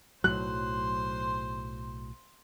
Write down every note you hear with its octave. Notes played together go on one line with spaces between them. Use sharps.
B1 A2 F#3 C5 C6 F#6